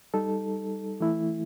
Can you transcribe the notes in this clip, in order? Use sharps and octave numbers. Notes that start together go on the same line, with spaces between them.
G3 D#4 A4
E3 A3 E4